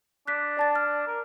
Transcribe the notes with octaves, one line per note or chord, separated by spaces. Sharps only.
D4 F#6 B6
D5 A5 A6
F6
A#4